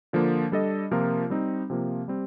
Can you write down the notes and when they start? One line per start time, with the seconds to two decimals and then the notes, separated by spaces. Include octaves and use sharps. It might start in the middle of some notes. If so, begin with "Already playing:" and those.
0.13 D3 F3 A#3
0.52 G3 D4 A4 D#5
0.91 C3 F3 A#3 F4 A#4
1.30 G3 C4 D#4
1.70 C3 F3 A#3
2.08 G3 C4 G4